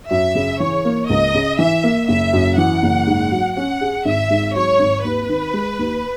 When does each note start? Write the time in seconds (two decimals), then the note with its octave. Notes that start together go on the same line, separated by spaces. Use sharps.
0.11 F#2 E5
0.35 C#3
0.60 E3 C#5
0.85 A#3
1.09 C#2 D#5
1.34 C#3
1.59 E3 E5
1.84 A#3
2.09 F#1 E5
2.33 F#2
2.58 E3 F#5
2.83 F#1
3.07 G#2
3.32 F#3
3.56 C#4 F#5
3.81 G#4
4.05 G#1 E5
4.30 G#2
4.55 F#3 C#5
4.79 G#1
5.04 D#2 B4
5.29 D#3
5.53 G#3
5.79 D#2